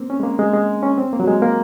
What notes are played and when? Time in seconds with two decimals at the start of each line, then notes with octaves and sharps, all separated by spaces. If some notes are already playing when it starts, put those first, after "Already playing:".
Already playing: A#3 C4
0.10 C#4
0.20 G#3
0.23 A#3
0.39 G#3
0.53 G#3
0.83 C#4
0.98 C4
1.13 A#3
1.20 F#3
1.27 G#3
1.42 A#3